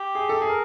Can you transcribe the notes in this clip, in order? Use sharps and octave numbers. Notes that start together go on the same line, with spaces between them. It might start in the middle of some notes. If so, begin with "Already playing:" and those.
Already playing: G4
G#4
A4
G#4
A#4